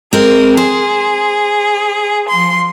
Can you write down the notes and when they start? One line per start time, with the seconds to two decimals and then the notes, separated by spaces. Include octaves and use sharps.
0.13 G#3 C4 A#4
0.57 G#4 C5
2.29 F3 C6